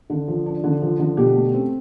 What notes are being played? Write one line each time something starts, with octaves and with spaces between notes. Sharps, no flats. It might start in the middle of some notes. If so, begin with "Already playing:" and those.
D3
F3
D4
D3
F3
D3
B2 G4
A3
C4